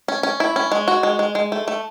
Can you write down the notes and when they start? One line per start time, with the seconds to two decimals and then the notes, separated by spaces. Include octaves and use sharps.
0.08 C#4
0.23 C#4
0.40 E4
0.56 C#4
0.72 G#3
0.88 F#4
1.03 G#3
1.19 G#3
1.35 G#3
1.52 A3
1.68 A3